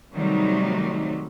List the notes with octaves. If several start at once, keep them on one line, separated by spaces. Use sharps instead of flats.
C3 D#3 F#3 G3 A3 D#4